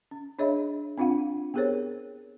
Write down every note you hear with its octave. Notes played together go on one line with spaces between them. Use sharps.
C#4
D4 G#4 C#5 D#5 E5 B5
C4 D4 F4 F5 F#5
B3 G4 G#4 A#4 C5 C#5